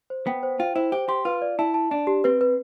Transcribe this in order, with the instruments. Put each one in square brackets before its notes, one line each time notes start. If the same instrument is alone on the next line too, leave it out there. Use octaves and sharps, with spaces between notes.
[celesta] C5
[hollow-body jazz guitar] B3 [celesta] G5
[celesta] C5
[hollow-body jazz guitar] F4 [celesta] G5
[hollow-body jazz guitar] E4 [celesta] C5
[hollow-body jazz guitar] G4 [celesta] C5
[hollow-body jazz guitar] G4 [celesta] C6
[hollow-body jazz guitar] F4 [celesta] B4
[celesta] D5
[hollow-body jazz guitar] E4 [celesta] A5
[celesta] A5
[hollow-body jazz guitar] D4 [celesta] A5
[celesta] G4
[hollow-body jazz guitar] C4 [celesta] B4
[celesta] B4